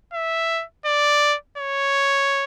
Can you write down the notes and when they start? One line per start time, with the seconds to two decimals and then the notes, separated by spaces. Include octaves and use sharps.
0.13 E5
0.86 D5
1.58 C#5